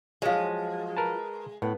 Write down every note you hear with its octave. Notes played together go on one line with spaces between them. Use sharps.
F3 F#3 G#3
A#4 B4 A5
A2 B3